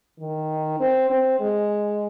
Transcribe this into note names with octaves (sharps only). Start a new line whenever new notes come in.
D#3
C4
C4
G#3